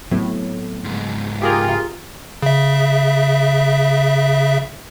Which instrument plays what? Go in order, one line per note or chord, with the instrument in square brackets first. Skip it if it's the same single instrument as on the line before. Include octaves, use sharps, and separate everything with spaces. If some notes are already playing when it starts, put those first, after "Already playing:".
[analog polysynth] A2 [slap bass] F#3 B3 C4
[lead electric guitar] C#2 G#2
[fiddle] F4 [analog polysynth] G4 G#4 A#4
[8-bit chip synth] C#3 E5